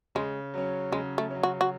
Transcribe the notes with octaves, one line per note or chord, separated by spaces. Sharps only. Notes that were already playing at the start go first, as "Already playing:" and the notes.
C#3 G#3
F#3 C#4
C#3 G#3
A3
F#3 C#4
F#4
F#4